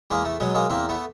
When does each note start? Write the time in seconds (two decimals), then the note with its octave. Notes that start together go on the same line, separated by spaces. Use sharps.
0.11 E2 G#3 A#3
0.25 A3
0.40 B2 F#3 G#3
0.55 G#3 A#3
0.70 E2 A#3 C4
0.89 A3 B3